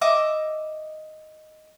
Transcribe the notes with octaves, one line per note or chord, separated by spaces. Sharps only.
D#5 E5 D6